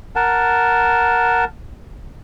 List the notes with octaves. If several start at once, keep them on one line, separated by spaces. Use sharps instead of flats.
A#4 F#5 A5